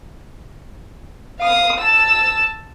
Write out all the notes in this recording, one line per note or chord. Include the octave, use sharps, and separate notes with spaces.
F5 D#6
A5 E6